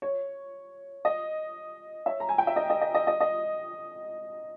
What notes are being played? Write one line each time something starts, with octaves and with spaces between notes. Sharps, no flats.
C#5
D#5
C#5 E5
A#5
G#5
G5
E5
D#5
D#5
D#5
D#5
D#5
D#5